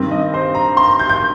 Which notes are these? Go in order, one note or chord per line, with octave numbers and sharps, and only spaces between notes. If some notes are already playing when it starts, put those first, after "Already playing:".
Already playing: G2 D#3 C4
D#5
C5
A#5
C6
G6
G6